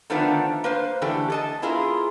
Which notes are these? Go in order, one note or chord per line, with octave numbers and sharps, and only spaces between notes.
D3 D#3 F3 A3 B3 D4
A#3 B4 C5
D3 E3 A3 G4 A4
A4 D#5 A5
B3 E4 F4 G#4 A#4